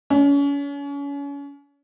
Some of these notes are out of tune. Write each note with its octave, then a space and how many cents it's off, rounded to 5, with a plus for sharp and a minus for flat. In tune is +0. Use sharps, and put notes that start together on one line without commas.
C#4 +35